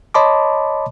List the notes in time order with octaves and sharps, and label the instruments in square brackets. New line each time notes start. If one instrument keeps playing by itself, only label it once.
[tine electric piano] C#5 D#5 A5 B5 C6 D6